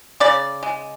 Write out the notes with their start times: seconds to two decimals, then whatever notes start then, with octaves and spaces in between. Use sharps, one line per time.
0.20 C#3 D5
0.63 G#3